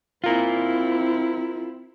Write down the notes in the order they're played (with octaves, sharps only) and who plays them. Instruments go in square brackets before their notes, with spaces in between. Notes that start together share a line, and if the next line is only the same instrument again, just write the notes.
[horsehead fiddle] C4 E4 [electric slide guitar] F4 A#4